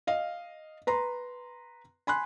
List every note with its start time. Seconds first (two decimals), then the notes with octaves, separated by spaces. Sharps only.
0.07 D#5 F5
0.87 B4 A#5 C6
2.07 G#5 B5 C6 F#6